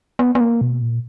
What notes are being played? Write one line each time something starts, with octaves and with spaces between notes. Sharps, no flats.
B3
B3
A#3
B2
A#2